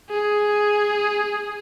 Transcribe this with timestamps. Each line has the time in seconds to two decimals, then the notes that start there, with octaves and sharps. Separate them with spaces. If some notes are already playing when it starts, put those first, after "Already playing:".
0.10 G#4